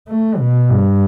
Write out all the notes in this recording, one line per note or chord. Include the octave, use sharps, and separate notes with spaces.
A3
B2
G2